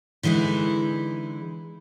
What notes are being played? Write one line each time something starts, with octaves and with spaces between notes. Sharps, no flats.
D3 E3 G#3 D#4 E4